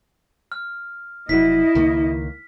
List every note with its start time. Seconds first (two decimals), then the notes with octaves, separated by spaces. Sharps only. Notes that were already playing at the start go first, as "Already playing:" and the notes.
0.52 F6
1.29 F1 F#3 E4 D#5 B6
1.75 C#2 D#3 A#3